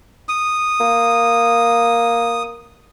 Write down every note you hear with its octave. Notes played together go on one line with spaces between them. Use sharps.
D#6
A#3